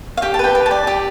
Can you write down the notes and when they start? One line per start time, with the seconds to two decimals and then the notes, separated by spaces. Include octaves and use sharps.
0.17 F5
0.22 G4 G5
0.34 A5
0.39 B4 G5
0.55 G4
0.66 A5
0.71 D5
0.87 G4